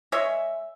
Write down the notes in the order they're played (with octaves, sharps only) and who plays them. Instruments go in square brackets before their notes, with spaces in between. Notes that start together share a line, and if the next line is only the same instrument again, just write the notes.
[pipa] G#3 C#5 E5